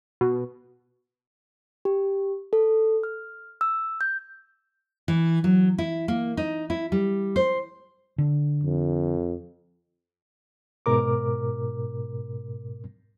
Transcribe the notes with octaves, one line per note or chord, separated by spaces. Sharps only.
B2
G4
A4
F6
E6
G6
E3
F#3
E4
A#3
D#4
E4
G3
C5
D3
F2
G#2 B2 A#4 D6